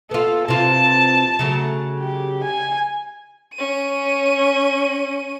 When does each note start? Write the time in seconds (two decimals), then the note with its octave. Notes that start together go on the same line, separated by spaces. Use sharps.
0.11 B3 F4 A4
0.48 C3 E3 F4 A5
1.39 C#3 F#3 A3
2.01 G4
2.45 G#5
3.55 C#4 D#7